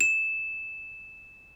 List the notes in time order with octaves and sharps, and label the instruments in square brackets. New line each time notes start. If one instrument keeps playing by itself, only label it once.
[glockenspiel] E7